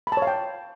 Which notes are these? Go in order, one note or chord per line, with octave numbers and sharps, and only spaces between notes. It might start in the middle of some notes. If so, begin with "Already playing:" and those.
B5
A5
C#5
F5
G5